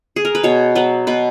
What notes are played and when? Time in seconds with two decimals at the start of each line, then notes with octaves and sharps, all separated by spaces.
0.16 G#4
0.25 A#4
0.35 B4
0.43 B2 C#5
0.75 F#3 B3 B4
1.07 B2 B4